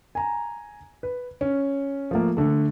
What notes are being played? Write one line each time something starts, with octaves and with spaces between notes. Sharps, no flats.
G#5 A#5
B4
C#4
F3 A3 A#3
D3 A3